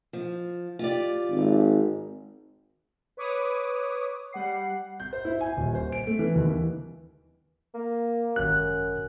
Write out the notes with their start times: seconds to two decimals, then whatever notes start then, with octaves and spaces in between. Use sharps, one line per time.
0.13 F3
0.79 F4 G4 D5
1.30 G#1
3.17 B4 C#5 D6 D#6
4.33 G3 F#5 C7
5.00 G6
5.13 C5
5.25 E4
5.41 G#5
5.57 D#1
5.75 C5
5.92 D7
6.07 A3
6.19 E3
6.35 D#2
6.48 E3
7.74 A#3
8.36 G#1 F#2 F#6